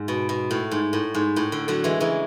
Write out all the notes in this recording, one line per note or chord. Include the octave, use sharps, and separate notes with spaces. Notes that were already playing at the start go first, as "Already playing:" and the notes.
Already playing: G#2
B2
B2
A2
G#2
A2
G#2
A2
D3
D3 F#3
E3 G#3
C#3 E3